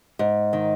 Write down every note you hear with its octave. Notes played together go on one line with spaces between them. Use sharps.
G#2
D#3